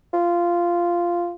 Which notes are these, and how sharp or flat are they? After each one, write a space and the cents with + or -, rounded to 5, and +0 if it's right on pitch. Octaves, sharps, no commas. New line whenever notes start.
F4 -10